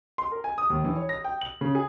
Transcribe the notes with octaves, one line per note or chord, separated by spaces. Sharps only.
C6
A#4
G#5
D#6
D#2
E3
C#5
A#6
G5
F#7
C#3
G#4